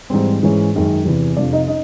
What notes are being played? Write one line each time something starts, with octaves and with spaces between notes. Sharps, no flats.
G#2 E3 G3 C4
G#2 E3 G#3 C#4
F#2 D#3 G#3 C#4
E2 C3 E3
F2 C3 F3 D4 D5
D#4 D#5
C#4 D#4 D#5